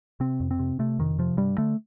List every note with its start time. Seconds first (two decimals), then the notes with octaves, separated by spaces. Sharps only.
0.20 C3 C4
0.40 F2
0.51 C4
0.59 C3
0.79 C3 A3
0.99 F2 D#3
1.19 C3 F3
1.37 G2 G3
1.58 D3 A3